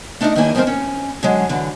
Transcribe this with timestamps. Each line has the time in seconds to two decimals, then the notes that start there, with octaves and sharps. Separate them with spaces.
0.21 A3 D4 D#4 A#4 D#5
0.35 D#2 D#3 G3 A#3 E4 G#5
0.55 F3 G#3 A3 C4 A#4 C5
0.67 C#4
1.23 D3 F#3 G#3
1.49 D3 E3 F#3